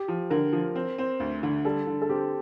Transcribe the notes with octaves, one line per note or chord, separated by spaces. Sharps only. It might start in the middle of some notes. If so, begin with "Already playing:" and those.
Already playing: G4
F3
D3 A#4
F3
C4
C4
D2
D3
G3 A4
D3
A4
C4 G4